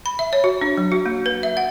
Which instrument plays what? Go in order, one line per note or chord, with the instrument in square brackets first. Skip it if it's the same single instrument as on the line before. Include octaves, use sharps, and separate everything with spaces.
[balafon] B5
E5
C#5
F#4
D4
F#3
F#4
A#3
B4
E5
F#5